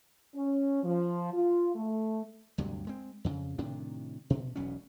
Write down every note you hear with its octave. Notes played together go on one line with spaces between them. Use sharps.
C#4
F3
F4
A3
D2 G2 C3 F#3
G#3 C4
F2 C#3
A2 C3 D#3 D4
B2
E1 B1 B2 C#4